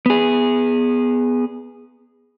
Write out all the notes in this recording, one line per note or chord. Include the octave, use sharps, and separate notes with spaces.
B3 G#4